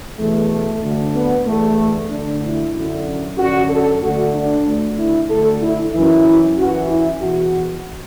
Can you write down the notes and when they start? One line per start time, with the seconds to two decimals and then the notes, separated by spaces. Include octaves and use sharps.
0.18 E2 B2 A3
0.82 D2 D3
1.14 B3
1.46 E2 D3 A3
2.10 D2 D3 D4
2.42 E4
2.74 F#2 D3
3.37 F#2 D3 F#4
3.70 A4
4.01 D2 D3 F#4
4.33 D4
4.65 D2 D3
4.98 E4
5.29 D2 D3 A4
5.61 E4
5.93 F#2 E3 E4
6.57 F#2 E3 F#4
6.89 E4
7.21 E2 B2 F#4